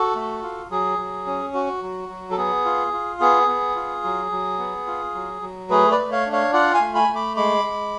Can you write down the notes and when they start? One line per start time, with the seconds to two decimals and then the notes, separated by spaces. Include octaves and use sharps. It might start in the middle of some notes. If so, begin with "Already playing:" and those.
Already playing: F#4 A4
0.15 A3
0.43 F4
0.71 F#3 G#4
0.99 F#3
1.26 C#4
1.54 F#4
1.82 F#3
2.09 F#3
2.31 A4
2.37 B3 G#4
2.65 F4
2.93 F4
3.20 B3 G#4
3.48 B3
3.76 F4
4.04 F#3
4.32 F#3
4.59 B3
4.87 F4
5.15 F#3
5.42 F#3
5.70 A3 G#4 B4
5.91 B4 D5
5.98 A3
6.11 C#5 F5
6.26 D4
6.33 C#5 F5
6.53 F4 D5 F#5
6.74 F5 G#5
6.81 A3
6.95 G#5 B5
7.08 A3
7.15 B5 D6
7.37 G#3 B5 D6
7.65 G#3